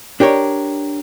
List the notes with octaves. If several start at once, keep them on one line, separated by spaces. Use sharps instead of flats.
D4 G4 A#4 C#5